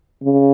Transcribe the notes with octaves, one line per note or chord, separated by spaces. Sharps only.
C#3